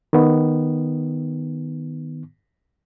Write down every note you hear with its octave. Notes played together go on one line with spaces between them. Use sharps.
D#3 B3